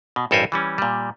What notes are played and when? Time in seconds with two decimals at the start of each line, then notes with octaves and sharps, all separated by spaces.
0.16 B2
0.31 A1 G2 A4 A#4 C5 G#5
0.52 E3 G3 C#4
0.78 A#2 G3